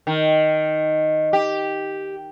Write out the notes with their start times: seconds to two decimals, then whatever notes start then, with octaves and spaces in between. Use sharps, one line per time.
0.07 D#3
1.33 G4